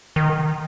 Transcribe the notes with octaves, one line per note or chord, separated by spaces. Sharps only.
D#3